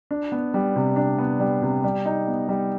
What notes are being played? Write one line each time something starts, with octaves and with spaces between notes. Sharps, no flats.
D4
B3
G3
C3
D4
B3
G3
C3
G3
D#4
B3
G3